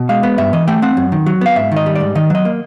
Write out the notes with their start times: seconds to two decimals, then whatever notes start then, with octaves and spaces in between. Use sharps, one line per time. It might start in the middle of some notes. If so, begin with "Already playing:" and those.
Already playing: B2
0.09 G#3 F5
0.23 B3
0.38 G2 E5
0.53 E3 D#5
0.67 A3 G5
0.82 C4 F#5
0.97 F#2
1.12 D#3
1.26 F#3
1.41 B3 F5
1.56 G#2 E5
1.72 D#3 D#5
1.86 G3
1.95 D5
2.00 G#2
2.15 D#3 D#5
2.30 F#3 D#5
2.45 A#3